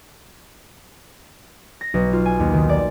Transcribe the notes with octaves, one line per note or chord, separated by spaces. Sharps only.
A#6
B1
F4
G#5
D#2
D#3
D5